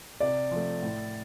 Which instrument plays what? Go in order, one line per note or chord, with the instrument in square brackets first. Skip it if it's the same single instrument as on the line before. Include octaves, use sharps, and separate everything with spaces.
[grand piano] C3 [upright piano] D5
[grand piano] F3 A3
A2